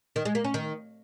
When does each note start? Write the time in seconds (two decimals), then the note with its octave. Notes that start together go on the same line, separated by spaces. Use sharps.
0.16 D#3
0.25 G#3
0.35 A#3
0.44 C#4
0.54 D#3